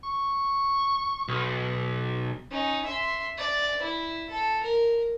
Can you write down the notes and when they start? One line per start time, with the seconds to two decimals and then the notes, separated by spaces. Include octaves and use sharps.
0.03 C#6
1.28 B1
2.51 C#4 D#4
2.85 E5 C6
3.38 D5
3.82 E4
4.30 A4
4.64 A#4